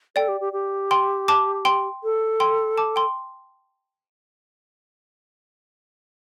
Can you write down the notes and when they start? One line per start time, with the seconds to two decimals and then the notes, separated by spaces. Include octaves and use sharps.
0.16 A4 D5 G5
0.28 G4
0.41 G4
0.53 G4
0.91 G5 C6
1.28 A5 D6
1.65 G5 C6
2.04 A4
2.40 G5 C6
2.78 A5 D6
2.96 G5 C6